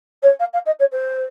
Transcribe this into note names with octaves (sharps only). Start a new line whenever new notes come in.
C#5
F5
F5
D#5
C#5
C5